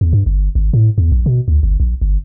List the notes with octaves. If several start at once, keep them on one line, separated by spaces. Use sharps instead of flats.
E2
G2
G1
G#1
A2
E2
A#1
B2
D2
G1
A#1
G1